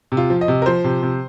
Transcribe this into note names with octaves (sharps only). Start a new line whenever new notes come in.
C3
F4
F3
D#5
C3
A#4
F3 C5
C3
C3